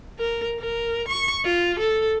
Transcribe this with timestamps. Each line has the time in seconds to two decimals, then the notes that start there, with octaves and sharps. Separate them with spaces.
0.19 A#4
0.59 A#4
1.08 C#6
1.44 F4
1.79 A4